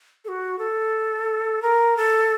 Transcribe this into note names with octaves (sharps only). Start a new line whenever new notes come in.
A4
F#4
A4
A#4
A4